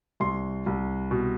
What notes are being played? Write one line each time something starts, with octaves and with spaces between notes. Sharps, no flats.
C2 C6
C2
B2